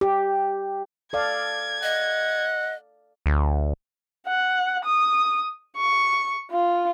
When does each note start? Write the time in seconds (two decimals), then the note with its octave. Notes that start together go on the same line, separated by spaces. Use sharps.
0.01 G4
1.13 A4 D5 F5 G#6
1.83 D#5 F#5
3.26 D2
4.28 F#5
4.85 D#6
5.77 C#6
6.51 F4